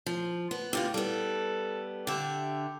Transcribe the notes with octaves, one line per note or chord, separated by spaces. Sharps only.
F3
B3
E2 D3 F4 G4
G3 B3 A4
D3 G4 E5